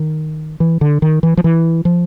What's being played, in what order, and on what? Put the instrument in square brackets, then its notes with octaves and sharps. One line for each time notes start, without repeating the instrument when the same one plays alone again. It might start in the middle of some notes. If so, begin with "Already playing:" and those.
Already playing: [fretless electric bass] D#3
E3
D3
D#3
E3
F3
E3
F3